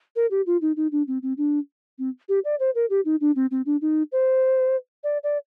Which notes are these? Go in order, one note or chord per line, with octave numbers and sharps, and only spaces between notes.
A#4
G4
F4
D#4
D#4
D4
C4
C4
D4
C4
G4
D5
C5
A#4
G4
D#4
D4
C4
C4
D4
D#4
C5
D5
D5